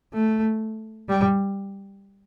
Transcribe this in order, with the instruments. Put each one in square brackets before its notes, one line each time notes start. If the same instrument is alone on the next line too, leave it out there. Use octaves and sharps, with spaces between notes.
[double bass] A3
G3